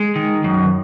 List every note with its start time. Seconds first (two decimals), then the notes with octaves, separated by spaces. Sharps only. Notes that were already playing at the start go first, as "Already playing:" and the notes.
Already playing: G#3
0.16 D#3
0.44 F#2